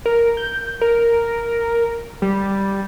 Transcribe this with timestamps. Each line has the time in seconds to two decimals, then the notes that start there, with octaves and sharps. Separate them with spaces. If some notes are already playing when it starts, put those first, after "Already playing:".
0.06 A#4
0.37 G6
0.81 A#4
2.22 G3